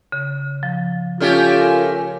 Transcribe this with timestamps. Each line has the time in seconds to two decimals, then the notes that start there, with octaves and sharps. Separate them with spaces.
0.12 C#3
0.63 F3
1.20 A3 C#4 F4 G4 F6 A6
1.61 A#4 G#5